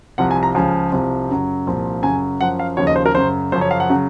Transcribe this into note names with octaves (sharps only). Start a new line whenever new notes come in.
C2 C3 F3 F#5
G#5
A#5
C#2 C#3 F3 G#5
C2 C3 F3
F#2 C#3 F#3
C2 A#2 F3
F#2 C#3 F#3 G#5
F#2 F3 F#5
F5
D#2 C#3 F3 C#5
D#5
C5
A#4
F#2 C#3 F#3 C5
F#2 C#3 F3 C5
C#5
F5
F#5
C#3 F#3